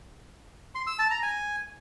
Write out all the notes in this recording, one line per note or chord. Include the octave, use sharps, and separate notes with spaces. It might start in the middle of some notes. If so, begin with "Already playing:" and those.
C6
E6
A5
A#5
G#5